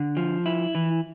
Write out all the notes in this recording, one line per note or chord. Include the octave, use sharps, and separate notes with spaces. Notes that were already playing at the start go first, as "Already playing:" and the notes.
Already playing: D3
F3
E4
E3